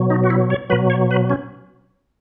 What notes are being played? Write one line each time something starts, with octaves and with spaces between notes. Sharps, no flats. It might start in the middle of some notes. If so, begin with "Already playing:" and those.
Already playing: B2 F#3
D#4
F#4
E4
C#5
B2 F#3 B4
C#5
B4
C#4